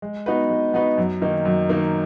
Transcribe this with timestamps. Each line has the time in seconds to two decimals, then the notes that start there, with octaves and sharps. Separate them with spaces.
0.02 G#3
0.26 B3 D#4 F#4 B4
0.50 G#3
0.74 B3 D#4 F#4 B4
0.98 F#2
1.22 D#3 A#3 D#4
1.45 F#2
1.69 D#3 A#3 D#4